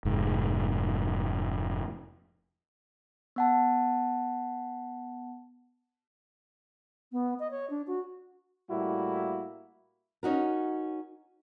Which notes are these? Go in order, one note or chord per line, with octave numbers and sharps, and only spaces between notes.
F1 G#2
B3 F#5 A5
B3
D#5
C#5
D4
F#4
A2 G3 A#3 E4 F#4
C#4 D#4 F#4 A#4